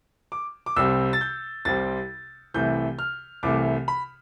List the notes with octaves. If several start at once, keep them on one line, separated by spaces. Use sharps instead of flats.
D6
D6
C2 C3 G3 C4 E6
A6
G6
C2 C3 G3 C4 A6
C2 C3 E3 A3 G6
F6
C2 C3 E3 A3 D6
B5